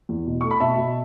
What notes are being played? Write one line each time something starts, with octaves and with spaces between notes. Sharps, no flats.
E2
B2
A3 C#6
B5
B2 E5 A5
B2